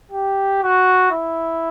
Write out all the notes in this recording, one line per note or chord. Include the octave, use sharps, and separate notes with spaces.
G4
F#4
E4